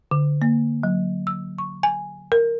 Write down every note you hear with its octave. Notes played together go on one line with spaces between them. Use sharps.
D3
A#3
F#3
E6
C#6
G#5
A#4